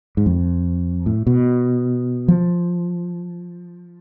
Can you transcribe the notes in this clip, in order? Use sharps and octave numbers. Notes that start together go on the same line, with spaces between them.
G#2
F2
A2
B2
F3